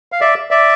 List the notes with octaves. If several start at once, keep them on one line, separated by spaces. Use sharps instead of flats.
F5
D5 E5
D5 E5